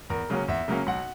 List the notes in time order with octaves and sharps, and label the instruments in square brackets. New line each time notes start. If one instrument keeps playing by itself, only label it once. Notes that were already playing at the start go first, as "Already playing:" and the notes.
[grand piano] E2 A#4
C#3 F#3 A#3 C#4
E2 E5
C#3 F#3 A#3 C#4
B1 F#5